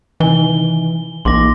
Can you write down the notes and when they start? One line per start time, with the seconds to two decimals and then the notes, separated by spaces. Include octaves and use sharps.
0.20 C3 D#3 E3 D#4 G#5 G7
1.25 A#1 E3 A#3 D#4 C6 D6 A#6